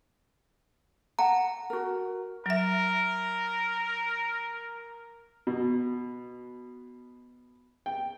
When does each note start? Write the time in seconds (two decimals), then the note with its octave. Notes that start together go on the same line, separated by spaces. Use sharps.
1.19 F#5 A5 A#5
1.70 F#4 A#4
2.46 F#3 A#4 E5
5.47 B2
7.86 G5